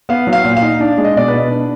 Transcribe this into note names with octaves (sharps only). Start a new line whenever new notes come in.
B3 F5
F#3
F5
A#2
F5
D#4
D4
G#3
D#5
B2 D5
B4
B2
D4